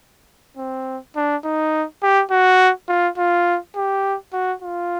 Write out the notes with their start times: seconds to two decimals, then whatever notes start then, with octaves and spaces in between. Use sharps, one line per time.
0.57 C4
1.16 D4
1.44 D#4
2.03 G4
2.31 F#4
2.88 F4
3.18 F4
3.76 G4
4.33 F#4
4.63 F4